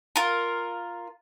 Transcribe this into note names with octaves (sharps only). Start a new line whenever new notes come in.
F4 A#4